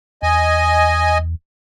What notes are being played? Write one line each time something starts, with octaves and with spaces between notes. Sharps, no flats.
E2 D#5 G#5